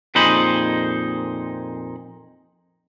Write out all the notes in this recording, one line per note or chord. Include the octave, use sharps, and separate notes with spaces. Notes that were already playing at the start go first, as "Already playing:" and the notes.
F2 A#2 D#4 G#4 C5 B5